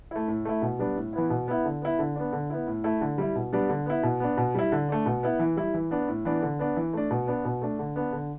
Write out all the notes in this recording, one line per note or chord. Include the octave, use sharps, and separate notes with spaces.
A3 E4
A2
A3 E4
B2
G3 B3 D4
A2
E3 B3 E4
B2
B3 E4
D3
B3 E4
D3
B3 D4
D3
B3 E4
A2
A3 E4
D3
G3 E4
B2
G3 B3 D4
D3
B3 E4
B2
B3 D4
B2
G3 E4
D3
A3 D4
B2
B3 E4
E3
G3 E4
E3
B3 D4
A2
E3 B3 D4
D3
B3 D4
E3
A3 D4
B2
B3 D4
B2
A3 D4
D3
B3 D4
D3